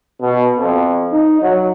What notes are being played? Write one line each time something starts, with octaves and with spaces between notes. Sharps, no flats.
B2
F2
D#4
F#3